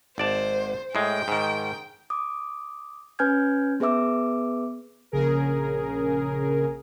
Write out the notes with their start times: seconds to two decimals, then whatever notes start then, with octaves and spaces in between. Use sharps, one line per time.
0.18 G#1 C5 D5 A5
0.95 A2 G#3 G5
1.28 G#2 D#3
2.10 D6 D#6
3.19 C#4 B4 G#5 F6 G6 G#6
3.80 B3 G#4 B4 E5 D6 E6
5.12 A#1 C#3 G#4 A#4